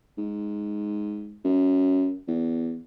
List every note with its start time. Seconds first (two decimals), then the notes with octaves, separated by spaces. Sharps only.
0.18 G#2
1.44 F#2
2.28 E2